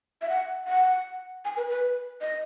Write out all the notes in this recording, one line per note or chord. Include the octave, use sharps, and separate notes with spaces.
E5
F#5
F#5
G#5
B4
B4
D#5